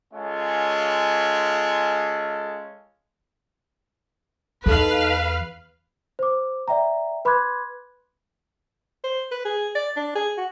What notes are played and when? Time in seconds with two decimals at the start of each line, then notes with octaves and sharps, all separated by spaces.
0.14 G#3 C#4 F4 A4
4.66 E2 D#4 A4 B4 F5
6.19 C5 D6
6.68 D5 E5 G5 A#5
7.25 B4 B5 C6 D6 F#6 G#6
9.04 C5
9.32 B4
9.45 G#4
9.76 D5
9.96 D4
10.16 G#4
10.38 F#4